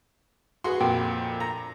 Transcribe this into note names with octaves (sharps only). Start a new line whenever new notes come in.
F#4 G#4 B4 C6
F2 A#2 G5
A#5